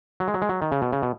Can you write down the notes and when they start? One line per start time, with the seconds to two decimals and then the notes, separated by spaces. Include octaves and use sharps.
0.20 F#3
0.28 G#3
0.34 F#3
0.42 G#3
0.49 F#3
0.62 D#3
0.72 C#3
0.82 B2
0.93 C#3
1.03 B2